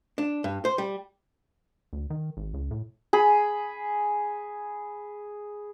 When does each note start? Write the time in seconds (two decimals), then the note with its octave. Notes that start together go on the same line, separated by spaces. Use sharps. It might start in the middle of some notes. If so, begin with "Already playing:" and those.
0.18 D4
0.44 G2
0.65 C5
0.78 G3
1.93 D2
2.10 D#3
2.37 G#1
2.54 C#2
2.71 A2
3.13 G#4 B5